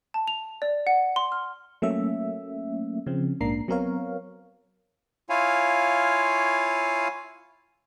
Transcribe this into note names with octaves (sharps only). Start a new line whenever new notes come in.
A5
F7
D5
F#5
C6
F6
F#3 A3 A#3 C#4 E5
C#3 F3 C4
A#1 G#2 A#3 D4 A#5 C7
F#3 B3 C4 A#4 C#5 F5
E4 F4 C#5 F5 G#5